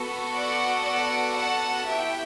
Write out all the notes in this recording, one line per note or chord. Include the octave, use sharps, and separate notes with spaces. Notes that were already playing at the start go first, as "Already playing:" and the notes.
Already playing: B3 F#4 A4
D5 F#5
D5 F#5
F#5 A5
B3 E4 G4 E5 G5